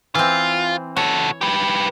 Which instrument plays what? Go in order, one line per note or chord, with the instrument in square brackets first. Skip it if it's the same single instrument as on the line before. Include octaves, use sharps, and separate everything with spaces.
[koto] E3 C4 [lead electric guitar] F4
[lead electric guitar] F#4 A4 [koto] C#5
[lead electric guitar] G4 B4